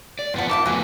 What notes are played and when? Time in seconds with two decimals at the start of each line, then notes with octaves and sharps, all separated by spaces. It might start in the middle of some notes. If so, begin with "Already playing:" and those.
0.19 D5
0.34 F2 F3 B3 C4 F#5
0.49 D#3 F4 E5 A5 D6
0.66 F2 A3 B3 F#4 G#5